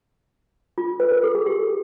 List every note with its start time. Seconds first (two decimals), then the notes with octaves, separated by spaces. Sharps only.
0.78 F4
1.00 B4
1.11 A#4
1.23 A4
1.35 G#4
1.46 G4